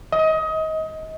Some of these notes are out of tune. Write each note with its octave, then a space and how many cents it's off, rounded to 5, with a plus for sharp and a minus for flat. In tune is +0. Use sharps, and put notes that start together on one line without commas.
D#5 +25